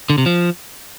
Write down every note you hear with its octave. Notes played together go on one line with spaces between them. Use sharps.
D3
C3
F3